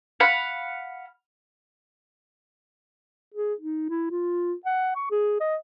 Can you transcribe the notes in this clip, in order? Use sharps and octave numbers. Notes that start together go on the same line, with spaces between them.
F5 F#5 B5
G#4
D#4
E4
F4
F#5
C#6
G#4
D#5